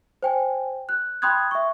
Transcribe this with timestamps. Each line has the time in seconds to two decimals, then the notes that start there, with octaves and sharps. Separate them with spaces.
0.23 C5 G5 G#5
0.89 F#6
1.22 G5 B5 C6 D#6 F#6 G#6
1.51 E5 C#6